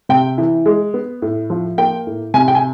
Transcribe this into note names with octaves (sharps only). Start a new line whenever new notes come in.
C3 G5
E3
G#3
B3
A2
F3
A#3 G5
A2
C3 G#5
G5
G#5